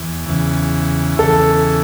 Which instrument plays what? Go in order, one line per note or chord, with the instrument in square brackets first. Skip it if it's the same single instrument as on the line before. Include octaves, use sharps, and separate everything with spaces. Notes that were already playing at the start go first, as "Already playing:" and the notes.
Already playing: [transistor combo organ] E2
E2 C#3 E3
[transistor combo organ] E2 C#3 E3 [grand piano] A4